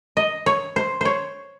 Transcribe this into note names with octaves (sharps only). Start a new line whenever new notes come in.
D#5
C#5
C5
C5 C#5